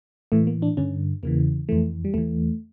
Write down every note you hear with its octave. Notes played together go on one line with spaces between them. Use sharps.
A2 E3 A3
A#3
D4
G2 D3 C#4
E2 C#3 E3 A#3
F2 E3 A3
G3
E2 E3 A3